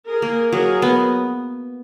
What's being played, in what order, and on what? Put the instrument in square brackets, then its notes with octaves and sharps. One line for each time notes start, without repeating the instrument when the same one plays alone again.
[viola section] G#4 A#4
[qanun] A#3
[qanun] F#3 [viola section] G#4 A#4
[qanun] B3